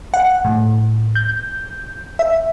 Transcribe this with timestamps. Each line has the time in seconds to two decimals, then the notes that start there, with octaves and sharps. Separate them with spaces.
0.14 F#5
0.45 A2
1.15 G6
2.19 E5